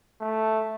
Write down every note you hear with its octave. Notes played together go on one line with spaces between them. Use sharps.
A3